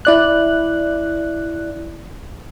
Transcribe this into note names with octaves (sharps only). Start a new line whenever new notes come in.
E4 D5 F#6